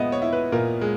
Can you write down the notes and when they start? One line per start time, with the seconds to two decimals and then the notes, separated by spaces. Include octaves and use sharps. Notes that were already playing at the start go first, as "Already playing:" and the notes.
Already playing: A#2 G#3 B3 D#5 E5
0.12 C#5
0.22 E4
0.33 B4
0.52 A#2 A#4
0.81 G#3